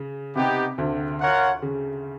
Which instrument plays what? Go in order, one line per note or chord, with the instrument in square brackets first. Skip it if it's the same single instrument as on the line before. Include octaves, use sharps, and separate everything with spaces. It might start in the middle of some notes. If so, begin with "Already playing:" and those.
Already playing: [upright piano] C#3
[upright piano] C3 [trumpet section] B3 D#4 G4
[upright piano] D2 D3
[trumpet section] F4 A#4 C#5 F#5
[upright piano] C#3